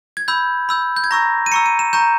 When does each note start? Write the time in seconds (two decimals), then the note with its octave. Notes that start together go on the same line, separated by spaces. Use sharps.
0.17 G#6
0.28 B5 E6 G6
0.69 B5 E6 G6
0.96 G6
1.04 G#6
1.11 A#5 C#6 E6 A#6
1.46 D#7
1.52 A#5 C#6 E6 C#7
1.66 D#7
1.79 E7
1.93 A#5 C#6 G6 E7